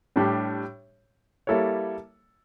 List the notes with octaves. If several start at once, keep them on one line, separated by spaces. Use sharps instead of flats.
A2 G3 D4 G4
G3 A#3 E4 A4 C#5